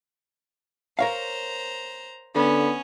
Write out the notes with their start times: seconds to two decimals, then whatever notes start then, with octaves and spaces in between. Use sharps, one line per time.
0.99 A#4 C5 C#5 F5 A#5
2.35 D3 B3 C#4